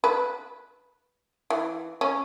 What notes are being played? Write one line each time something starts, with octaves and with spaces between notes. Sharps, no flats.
B4
E3
C#4